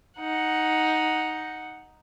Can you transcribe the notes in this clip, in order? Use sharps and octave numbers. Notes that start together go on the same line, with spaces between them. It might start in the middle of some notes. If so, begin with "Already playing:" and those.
D#4 F#5